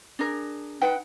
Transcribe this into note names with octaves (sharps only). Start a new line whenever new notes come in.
D4 G#4 A#4
D#4 B4 F#5 G5